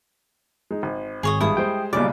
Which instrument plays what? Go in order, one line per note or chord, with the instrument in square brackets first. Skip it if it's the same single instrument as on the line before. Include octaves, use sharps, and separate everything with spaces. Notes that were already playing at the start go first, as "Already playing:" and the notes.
[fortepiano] G#3 D#4
G#1
[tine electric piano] G#1 [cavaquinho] G#4 C#5 D#5
[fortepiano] G2 G#3 [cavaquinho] E4 A4 D#6
[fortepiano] G3 G#3 C5 [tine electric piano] G5
[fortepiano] B1 A#2 C#3 [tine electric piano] G3 C#4 D5 [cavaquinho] D6